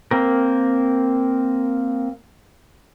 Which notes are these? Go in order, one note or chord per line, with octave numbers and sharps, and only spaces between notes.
A#3 C4 A#4